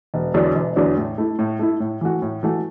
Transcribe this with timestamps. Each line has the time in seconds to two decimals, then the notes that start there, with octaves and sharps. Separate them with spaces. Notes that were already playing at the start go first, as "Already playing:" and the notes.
0.14 E1
0.34 E2 D3 F#3 D4
0.55 E1
0.76 E2 D3 F#3 D4
0.97 A2
1.18 A3 E4
1.39 A2
1.59 A3 E4
1.80 A2
2.01 E3 A3 F#4
2.22 A2
2.43 E3 A3 F#4